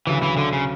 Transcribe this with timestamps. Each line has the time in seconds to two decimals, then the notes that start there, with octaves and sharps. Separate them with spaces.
0.07 D2 C#3 E3 F#3
0.23 E3
0.37 D3
0.53 C#3